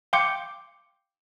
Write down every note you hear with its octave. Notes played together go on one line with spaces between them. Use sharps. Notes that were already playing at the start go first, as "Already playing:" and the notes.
F5 G5 C6 D6 G6 C#7